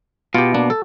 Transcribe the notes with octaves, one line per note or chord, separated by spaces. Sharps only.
B2 F4 G4
A#3 D4
A4